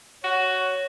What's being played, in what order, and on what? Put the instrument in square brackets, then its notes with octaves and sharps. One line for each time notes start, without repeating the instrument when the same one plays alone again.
[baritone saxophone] F#4 [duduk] C#5